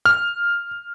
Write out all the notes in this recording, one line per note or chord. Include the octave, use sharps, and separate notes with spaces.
F6